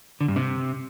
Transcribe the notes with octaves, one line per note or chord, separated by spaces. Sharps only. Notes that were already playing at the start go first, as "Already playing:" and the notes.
D3
G2
C3